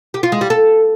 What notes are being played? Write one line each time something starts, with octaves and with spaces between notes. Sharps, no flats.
G4
F4
G#3
G3
A4